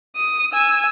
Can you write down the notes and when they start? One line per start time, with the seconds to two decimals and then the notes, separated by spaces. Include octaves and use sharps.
0.16 D#6
0.53 G#5 E6